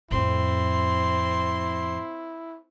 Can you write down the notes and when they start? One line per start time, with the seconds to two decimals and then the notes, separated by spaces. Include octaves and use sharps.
0.11 F2 A2 C4 E4 C6